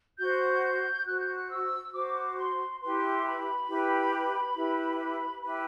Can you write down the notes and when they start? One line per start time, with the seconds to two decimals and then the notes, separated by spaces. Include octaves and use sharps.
0.19 F#4 C5 G6
0.63 G6
1.06 F#4 C5 F#6
1.19 G6
1.34 F#6
1.49 E6
1.93 F#4 C5 D6
2.37 C6
2.81 E4 G4 B4 C6
3.25 B5
3.68 E4 G4 B4
4.56 E4 G4 B4
5.42 E4 G4 B4 B5